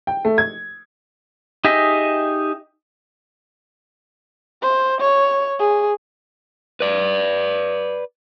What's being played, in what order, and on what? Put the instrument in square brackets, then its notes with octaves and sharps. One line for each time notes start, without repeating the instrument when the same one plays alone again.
[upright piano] G5
A3
G#6
[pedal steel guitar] D#4 G4 G#4 D#5 E5
[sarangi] C5
C#5
G#4
[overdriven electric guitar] B4 D5